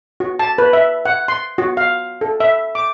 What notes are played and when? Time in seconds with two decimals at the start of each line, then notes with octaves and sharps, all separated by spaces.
0.20 F#4
0.39 A5
0.58 B4
0.73 E5
1.05 F#5
1.28 C6
1.58 F#4
1.77 F5
2.21 A4
2.40 E5
2.75 D6